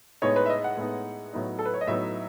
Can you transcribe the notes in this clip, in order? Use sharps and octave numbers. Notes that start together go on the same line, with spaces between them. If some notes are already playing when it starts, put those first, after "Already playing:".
A2 G#3 B3 D#4 C#5
B4
E5
D#5
F#5
A2 G#3 B3 D#4
A2 F#3 B3 D#4
A4
B4
C#5
D#5
A2 F#3 B3 D#4 E5